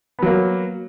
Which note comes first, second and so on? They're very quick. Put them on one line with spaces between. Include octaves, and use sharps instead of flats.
B3 F#3 A#3